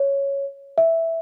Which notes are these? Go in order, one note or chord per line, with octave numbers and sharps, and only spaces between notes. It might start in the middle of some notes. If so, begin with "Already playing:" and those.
Already playing: C#5
E5